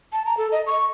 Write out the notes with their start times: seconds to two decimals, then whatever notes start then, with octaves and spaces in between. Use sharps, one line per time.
0.13 A5
0.25 A#5
0.37 A4
0.52 D#5
0.66 C#6